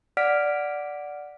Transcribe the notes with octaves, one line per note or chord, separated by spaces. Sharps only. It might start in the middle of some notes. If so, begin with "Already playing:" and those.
D5 F#5 F6 B6 D7